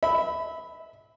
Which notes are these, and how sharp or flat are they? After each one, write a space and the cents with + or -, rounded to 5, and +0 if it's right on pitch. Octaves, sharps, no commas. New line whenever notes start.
E5 -20 B5 +10